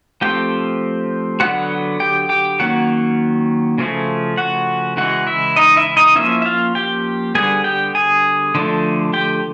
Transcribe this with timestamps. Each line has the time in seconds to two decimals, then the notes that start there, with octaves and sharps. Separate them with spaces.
0.21 F3 A3 C4 G4 G5
1.40 D3 F#3 B3 F#4 F#5
2.00 G4 G5
2.29 G4 G5
2.59 D#3 F#3 A#3 C#4 F#4 F#5
3.78 C#3 F3 A3 C#4
4.37 F#4 F#5
4.97 C#3 E3 G#3 F#4 F#5
5.27 E4 E5
5.56 D#4 D#5
5.77 E4 E5
5.97 D#4 D#5
6.16 F3 A#3 C#4 E4 E5
6.42 E5
6.45 F4 F5
6.75 G4 G5
7.35 D3 G3 B3 G#4 G#5
7.64 G4 G5
7.95 G#4 G#5
8.55 D3 F3 A3
9.13 G4 G5